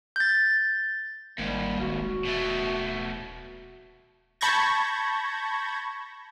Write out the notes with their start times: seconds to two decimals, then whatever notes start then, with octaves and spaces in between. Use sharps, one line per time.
0.16 G6 A6
1.38 G#1 D#2 G#2 G3
1.80 D1 F#4
2.25 B2 A3
4.41 A5 B5 C#6 G6 G#6 A#6